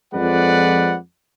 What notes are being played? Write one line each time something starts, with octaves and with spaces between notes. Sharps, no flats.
F2 F3 G#3 B4 D5 F#5